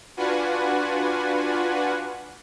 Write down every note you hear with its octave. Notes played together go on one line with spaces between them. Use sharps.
D4 F4 F#4 B4 F#5 G#5